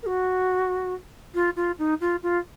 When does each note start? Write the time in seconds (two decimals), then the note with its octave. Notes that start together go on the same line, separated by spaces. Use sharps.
0.03 A#4
0.06 F#4
1.35 F4
1.56 F4
1.79 D#4
2.01 F4
2.23 F4